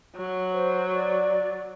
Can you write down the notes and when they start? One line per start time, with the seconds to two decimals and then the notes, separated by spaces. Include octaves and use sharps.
0.15 F#3
0.53 C5
0.93 D5